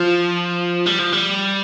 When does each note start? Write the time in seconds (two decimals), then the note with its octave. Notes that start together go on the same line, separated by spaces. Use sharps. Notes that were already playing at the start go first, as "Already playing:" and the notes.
Already playing: F3
0.87 G3
0.99 F3
1.13 G3